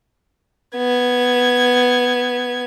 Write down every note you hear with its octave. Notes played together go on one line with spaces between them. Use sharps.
B3 G#6